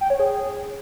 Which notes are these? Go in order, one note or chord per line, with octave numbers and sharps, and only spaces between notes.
G5
C#5
G#4